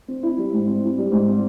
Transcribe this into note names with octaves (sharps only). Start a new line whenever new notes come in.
C4
E4
G3
G#2
C4
E4
G3
G#2
C4